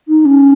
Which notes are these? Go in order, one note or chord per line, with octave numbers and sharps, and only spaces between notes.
D#4
C#4